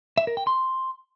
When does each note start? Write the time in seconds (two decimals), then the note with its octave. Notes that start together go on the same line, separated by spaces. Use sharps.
0.18 E5
0.27 A#4
0.37 G5
0.47 C6